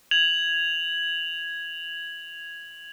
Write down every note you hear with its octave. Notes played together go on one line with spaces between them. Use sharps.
G#6 F7 F#7